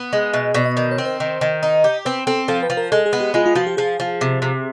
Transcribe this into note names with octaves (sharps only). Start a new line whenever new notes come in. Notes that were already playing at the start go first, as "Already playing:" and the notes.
Already playing: B3
G#3
B2 E5
B2 D5
D#5
D#3 D5
C#5
C4
C5
D#3
D#3
D#4
G4
C4 B4
C4 A4
F3 A4
B4
F3
A#4
G#3 A4
G#4
B3
G4
G#3 F4
F4
F3 F#4
G4
F3 G#4
F3
C3
C3